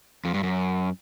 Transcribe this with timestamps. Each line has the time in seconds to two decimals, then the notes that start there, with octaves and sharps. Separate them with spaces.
0.25 F2
0.34 G2
0.43 F#2